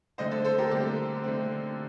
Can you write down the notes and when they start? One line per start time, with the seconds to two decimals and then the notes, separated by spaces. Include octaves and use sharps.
0.18 D3 A3 C4 C5 D#5
0.31 A4 C5
0.45 A4 C5
0.58 G4 A#4
0.71 D3 A3 C4 G4
1.24 D3 A3 C4